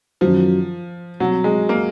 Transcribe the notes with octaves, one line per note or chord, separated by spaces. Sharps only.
F#2 D#3 F3 F#3
B2 F#3 G3 C4
G#3
A#3